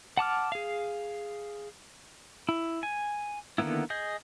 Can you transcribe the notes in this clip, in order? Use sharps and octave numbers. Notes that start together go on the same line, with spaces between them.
F#5 A5 D6 F6
G#4 F5
E4
G#5
D3 D#3 A#3 B3 E4
G#4 D#5 G6